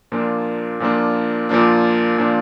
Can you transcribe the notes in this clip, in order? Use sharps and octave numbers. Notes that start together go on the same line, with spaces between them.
A#2 F3 A#3 D4
A#2 F3 A#3 D4
A#2 F3 A#3 D4
A#2 F3 A#3 D4